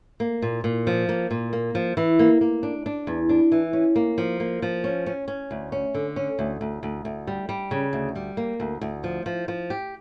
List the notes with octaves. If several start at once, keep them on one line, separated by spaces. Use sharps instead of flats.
A#3
A#2
A#2
F3
A#3
A#2
A#3
F3
E3
A#3
A#3
D4
D4
E2
D4
E3
C#4
A#3
F3
A#3
F3
C#4
C#4
C#4
D2
C#4
D3
C#4
D2
D2
D2
D2
G3
G3
C#3
D2
G3
A#3
D2
D2
F3
F3
F3
G4